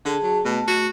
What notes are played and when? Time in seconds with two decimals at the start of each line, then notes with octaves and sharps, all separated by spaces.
0.05 D3 G#4 A5
0.23 F#3
0.45 B2 A3
0.68 F#4